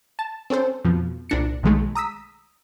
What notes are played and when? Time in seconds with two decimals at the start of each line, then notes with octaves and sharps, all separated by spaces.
0.19 A5
0.50 C4 C#4 A4 C5
0.84 F2 B2 F3
1.29 C2 A#2 D4 A#6 C#7
1.63 B1 D#3 G#3 A3
1.95 A#5 D#6 E6 B6